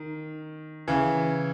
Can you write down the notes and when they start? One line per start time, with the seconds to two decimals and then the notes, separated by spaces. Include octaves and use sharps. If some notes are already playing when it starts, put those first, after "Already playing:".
Already playing: D#3
0.88 C#3 E3